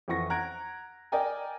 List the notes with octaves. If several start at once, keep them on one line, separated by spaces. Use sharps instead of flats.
F2 E3 F#5 C#6 A#6
F#5 A#5 F#6 G#6 D7
A#4 D5 D#5 G5 G#5 A#5